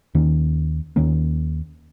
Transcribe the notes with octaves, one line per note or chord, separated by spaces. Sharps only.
D#2 D#3 A#3 C#4
D#2 D#3 A#3 C#4